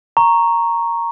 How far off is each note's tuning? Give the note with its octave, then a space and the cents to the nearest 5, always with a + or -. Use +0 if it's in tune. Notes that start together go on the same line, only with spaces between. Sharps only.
A#5 +0 C#6 -5